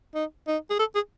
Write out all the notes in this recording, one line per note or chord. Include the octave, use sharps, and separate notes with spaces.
D#4
D#4
G#4
A4
G#4